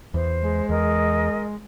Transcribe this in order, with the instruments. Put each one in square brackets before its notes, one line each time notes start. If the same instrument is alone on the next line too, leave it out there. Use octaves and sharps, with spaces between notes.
[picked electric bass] E2 [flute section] C5
[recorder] G#3
[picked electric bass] E2 [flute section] A#4 D#5